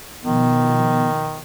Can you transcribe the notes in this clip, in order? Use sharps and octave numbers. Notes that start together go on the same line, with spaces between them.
B2 D#3 F3 B3